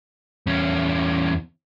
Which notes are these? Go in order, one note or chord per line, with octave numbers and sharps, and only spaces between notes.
E2 C#4